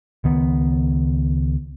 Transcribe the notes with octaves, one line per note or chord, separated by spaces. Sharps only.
C#2 D#3 B3